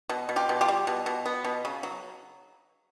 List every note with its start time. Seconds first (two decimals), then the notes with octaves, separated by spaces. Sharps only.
0.09 B2
0.29 B2
0.36 F4 G4
0.49 B2
0.61 F4 G4
0.68 G3
0.87 B2
1.06 B2
1.26 B3
1.44 B2
1.65 C#3
1.83 F#3